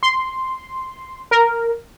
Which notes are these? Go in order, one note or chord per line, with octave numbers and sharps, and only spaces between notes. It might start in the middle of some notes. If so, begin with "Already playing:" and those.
C6
A#4